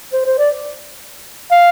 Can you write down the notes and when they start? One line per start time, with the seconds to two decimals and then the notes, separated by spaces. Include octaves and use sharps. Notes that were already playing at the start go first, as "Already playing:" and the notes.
0.13 C5
0.26 C5
0.39 D5
1.52 F5